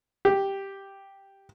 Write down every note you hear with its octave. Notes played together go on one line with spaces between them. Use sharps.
G4